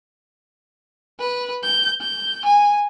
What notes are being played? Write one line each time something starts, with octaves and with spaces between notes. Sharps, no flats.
B4
G6
G6
G#5